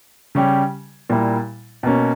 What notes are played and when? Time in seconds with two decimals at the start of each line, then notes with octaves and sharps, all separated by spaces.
0.35 C#3 G3 C#4 G4
1.10 A#2 G3 A#3 E4
1.83 B2 A#3 C#4